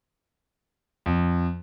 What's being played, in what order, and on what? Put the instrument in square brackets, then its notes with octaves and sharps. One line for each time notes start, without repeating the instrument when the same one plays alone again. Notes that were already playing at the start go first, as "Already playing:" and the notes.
[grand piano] F2